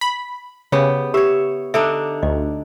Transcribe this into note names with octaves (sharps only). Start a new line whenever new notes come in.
B5
C#3 B3 G4 C#5
G4 C#5 E5
D3 D4 D#4 E5
D2 D#5